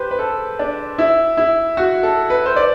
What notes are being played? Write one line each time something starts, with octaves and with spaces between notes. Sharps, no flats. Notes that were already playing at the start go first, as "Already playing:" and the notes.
Already playing: G4 B4 C5
B4
A4
D4
E4
E4
F#4
A4
B4
C5
D5